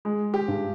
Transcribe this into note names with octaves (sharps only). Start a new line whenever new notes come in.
G#3
G4
G2